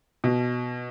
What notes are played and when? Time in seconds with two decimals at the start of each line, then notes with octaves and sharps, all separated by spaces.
0.24 B2